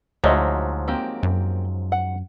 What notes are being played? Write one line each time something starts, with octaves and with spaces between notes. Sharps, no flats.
D2 G#2 F3 F#3 C#5 D#5 E5
A#3 C4 G4
F#2
F#5